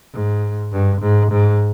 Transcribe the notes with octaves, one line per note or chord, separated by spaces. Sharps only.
G#2
G2
G#2
G#2